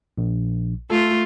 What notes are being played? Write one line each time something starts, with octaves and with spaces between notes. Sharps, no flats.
A#1
A3 F4 A4